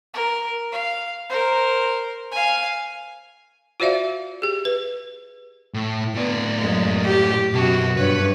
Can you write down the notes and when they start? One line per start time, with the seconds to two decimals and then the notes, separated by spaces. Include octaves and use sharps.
0.14 A#4
0.72 F5
1.30 A#4 C5
2.32 F5 G#5
3.80 F4 F#4 C5 D5 E5 F5
4.42 G4 G#4
4.65 B4
5.74 A2
6.15 A2 B3 D5
6.60 F#2 G#3
7.05 G4
7.53 F#2 B2 F#4 A5
7.97 G2 B4 C#5